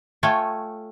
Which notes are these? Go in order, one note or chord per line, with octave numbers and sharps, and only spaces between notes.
A3 F4 A4 C#5 G5 G#5